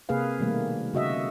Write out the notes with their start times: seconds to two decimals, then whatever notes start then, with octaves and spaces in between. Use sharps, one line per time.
0.09 C3 A#3 G#4 B4 F5
0.40 B2 D#3 G3 A3 A#3
0.94 C#3 F#4 D#5 E5